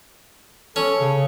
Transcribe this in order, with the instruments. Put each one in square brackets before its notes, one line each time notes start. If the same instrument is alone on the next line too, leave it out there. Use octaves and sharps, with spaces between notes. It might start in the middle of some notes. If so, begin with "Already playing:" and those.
[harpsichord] C#4 [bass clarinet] A4
[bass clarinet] C#3